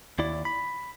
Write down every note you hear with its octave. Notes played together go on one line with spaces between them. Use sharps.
D#2 E4 D5
B5